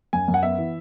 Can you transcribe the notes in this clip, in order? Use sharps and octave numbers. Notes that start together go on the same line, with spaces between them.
F#2 G#5
F#2
F#5
B3 E5
E3